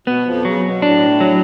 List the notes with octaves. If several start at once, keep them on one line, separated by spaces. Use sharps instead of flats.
B2 B3
F2 F3
C#3 F#3
B2
A2 D4
F#3